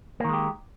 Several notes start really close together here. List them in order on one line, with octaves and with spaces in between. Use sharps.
A#3 D#3 G#3 G4